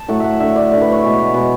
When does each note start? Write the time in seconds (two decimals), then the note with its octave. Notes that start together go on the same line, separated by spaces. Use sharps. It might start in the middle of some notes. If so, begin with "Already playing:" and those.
Already playing: A5
0.08 A2 F#3 A3 F#5
0.20 E5 F#5
0.40 D3 A3 E5
0.56 D5
0.71 D3 A3 D5
0.82 B4
0.92 C#5
1.03 B2 G#3
1.34 B2 G#3 B4